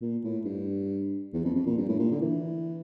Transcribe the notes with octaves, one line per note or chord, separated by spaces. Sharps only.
A#2
A2
G2
E2
F2
F2
A#2
G2
A2
A#2
D3
E3